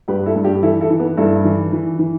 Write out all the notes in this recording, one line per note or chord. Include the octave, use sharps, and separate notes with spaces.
G2 G4 B4
E4 A4
G2
D4 G4
E3 E4 A4
E4 A4
E3
B3
G2 E4 A4
E3
E3
E3